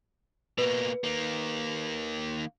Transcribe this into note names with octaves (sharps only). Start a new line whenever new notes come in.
B2 A#3 B4
D#3 A#3